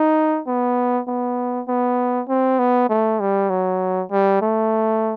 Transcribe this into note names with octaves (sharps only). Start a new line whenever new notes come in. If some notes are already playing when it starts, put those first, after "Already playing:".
Already playing: D#4
B3
B3
B3
C4
B3
A3
G3
F#3
G3
A3